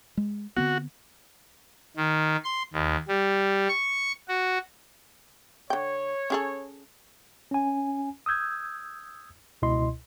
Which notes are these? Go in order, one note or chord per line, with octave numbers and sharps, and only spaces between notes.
G#3
D3 B3 C4 F#4
D#3
C6
D#2
G3
C#6
F#4
D3 C#5 G5
C#4 G#4 A4
C#4 G#5
D#6 E6 G6 G#6
C#2 B2 E4 D#5 C6